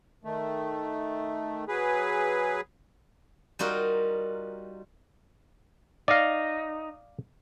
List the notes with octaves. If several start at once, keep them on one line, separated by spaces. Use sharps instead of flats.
D#3 A3
F#3 G#4 B4
G3 D#4 F4 F#4 A#4
D#4 D5 F5